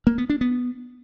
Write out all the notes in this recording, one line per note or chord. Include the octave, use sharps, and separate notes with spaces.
A#3
B3
D4
B3